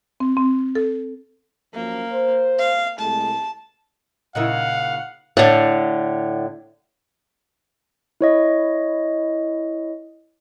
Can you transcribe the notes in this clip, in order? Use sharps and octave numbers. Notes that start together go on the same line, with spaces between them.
C4
C4
A4
F#2 F3 A#3
C5
F5
C2 G#3 A3 A5
A#2 C#3 D#4 E4 A#4 D#5 F5 F#5
A2 D3
E4 C#5 D#5